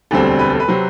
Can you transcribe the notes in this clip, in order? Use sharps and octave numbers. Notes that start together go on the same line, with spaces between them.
E1 D2 D3 G3 C4 A4
B4
A4
B4
C3 F#3 C4